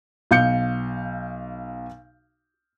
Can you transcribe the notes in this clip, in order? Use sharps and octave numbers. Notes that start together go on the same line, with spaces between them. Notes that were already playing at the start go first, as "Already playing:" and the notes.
B1 F5 G6 C#7